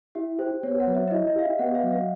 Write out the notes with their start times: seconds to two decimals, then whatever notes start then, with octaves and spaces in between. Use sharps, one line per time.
0.15 E4 G4
0.39 G4 C5
0.63 B3 C#5
0.80 F#5
0.87 F#3
0.95 E5
1.08 E5
1.11 E4 D#5
1.27 D#5
1.36 G4 F5
1.44 E5
1.59 B3 F#5
1.75 F5
1.84 F#3
1.92 F5